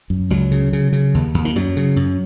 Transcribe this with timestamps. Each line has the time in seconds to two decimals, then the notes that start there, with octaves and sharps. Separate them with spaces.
0.10 F#2
0.30 C#2 F#3
0.51 C#3
0.73 C#3
0.93 C#3
1.14 D#2
1.34 D#2
1.45 D#3
1.56 F#2 F#3
1.77 C#3
1.96 F#2